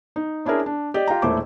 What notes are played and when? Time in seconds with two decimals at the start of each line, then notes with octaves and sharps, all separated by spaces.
0.16 D#4
0.45 C#4 D4 E4 G#4 A#4
0.66 D4
0.94 G4 D5 D#5
1.08 F4 G4 G5 A#5
1.22 E1 A#2 A3 E4 C5 D6